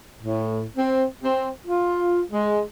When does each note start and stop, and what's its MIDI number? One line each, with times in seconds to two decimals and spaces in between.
0.22 0.63 45
0.77 1.05 60
1.23 1.49 60
1.67 2.21 65
2.31 2.62 56